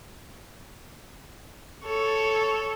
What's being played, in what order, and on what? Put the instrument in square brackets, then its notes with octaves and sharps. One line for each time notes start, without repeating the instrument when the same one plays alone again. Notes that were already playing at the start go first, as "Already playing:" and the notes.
[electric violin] A4 C#5